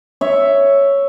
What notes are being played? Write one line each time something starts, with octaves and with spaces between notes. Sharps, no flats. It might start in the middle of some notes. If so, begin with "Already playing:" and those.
C#5 E5